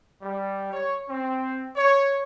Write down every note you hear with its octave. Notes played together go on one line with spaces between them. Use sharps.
G3
C#5
C4
C#5